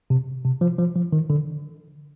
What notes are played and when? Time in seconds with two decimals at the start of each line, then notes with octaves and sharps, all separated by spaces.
0.10 C3
0.45 C3
0.61 F3
0.79 F3
0.96 F3
1.13 D#3
1.30 D3